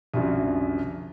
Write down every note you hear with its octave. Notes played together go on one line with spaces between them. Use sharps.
C2 F#2 D3 F3